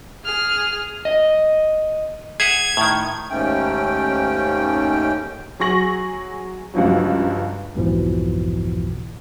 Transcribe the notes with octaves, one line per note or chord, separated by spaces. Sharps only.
G#4 F6
D#5
G#4 E5 F#5 G#6
A2 D#3
D#2 G#2 A3 C#4 G5
F#3 G#4 C#6 A#6 F#7
C#2 G2 F3 F#3
B1 F2 G#2 B2 E3 F3